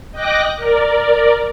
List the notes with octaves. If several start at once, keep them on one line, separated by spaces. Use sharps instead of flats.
D#5 G5 D6 F#6 A#6
A#4 D5